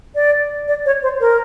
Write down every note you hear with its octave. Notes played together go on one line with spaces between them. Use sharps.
D5
D5
C#5
C5
A#4